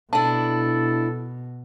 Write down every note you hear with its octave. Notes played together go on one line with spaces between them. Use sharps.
B2 D4 E4 A4 A5